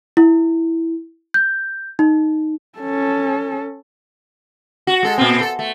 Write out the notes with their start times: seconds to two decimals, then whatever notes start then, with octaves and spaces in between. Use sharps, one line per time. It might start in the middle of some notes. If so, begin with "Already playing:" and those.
0.17 E4
1.34 G6
1.99 D#4
2.79 C#4 A4
4.87 F#4
5.03 G#3 A4
5.18 A#2 B3 C4
5.41 A4
5.59 A3